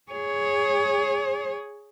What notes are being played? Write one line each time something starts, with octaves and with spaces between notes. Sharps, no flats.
G#4 C#5